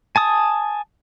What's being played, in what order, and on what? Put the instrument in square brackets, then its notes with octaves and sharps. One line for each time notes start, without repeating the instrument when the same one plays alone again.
[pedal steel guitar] G#5 A5 D#6